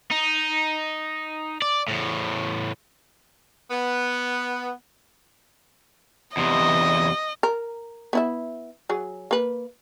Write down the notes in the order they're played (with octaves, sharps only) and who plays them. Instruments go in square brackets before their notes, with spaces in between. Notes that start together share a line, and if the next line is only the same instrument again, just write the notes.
[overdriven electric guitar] D#4
D5
E2 A2
[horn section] B3
[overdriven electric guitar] E2 C3 [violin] D#5
[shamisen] A#4
B3 E4 E5
F#3 G#4
A#3 B4